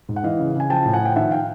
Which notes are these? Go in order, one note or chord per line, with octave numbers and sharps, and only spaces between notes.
G#2
F#5
E3 D#5 F5
C#3
C#3 G#5
F3 G5 A5
A2
F#5 G#5
F3 G5
D#3 E5 F#5
F5 G5